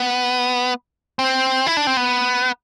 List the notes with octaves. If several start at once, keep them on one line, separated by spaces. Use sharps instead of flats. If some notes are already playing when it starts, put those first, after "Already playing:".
Already playing: B3
C4
E4
D4
C4
B3